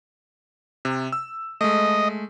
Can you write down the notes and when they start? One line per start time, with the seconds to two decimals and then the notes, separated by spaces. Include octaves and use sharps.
0.85 C3
1.12 E6
1.61 G#3 A3 D#5